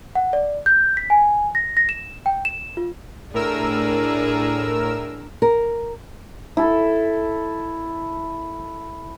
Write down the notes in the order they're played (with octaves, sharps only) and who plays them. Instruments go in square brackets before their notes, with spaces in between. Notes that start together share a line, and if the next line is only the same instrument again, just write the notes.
[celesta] F#5
D5
G6
B6
G#5
A#6
A#6
E7
G5
E7
F4
[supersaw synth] A2 A#4 E6 [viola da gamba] D4 G#4 D5
[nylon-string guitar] A#4
[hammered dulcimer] E4 A4